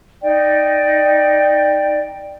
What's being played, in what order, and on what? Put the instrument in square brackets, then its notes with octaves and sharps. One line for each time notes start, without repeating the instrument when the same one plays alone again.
[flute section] D#4 D5 G5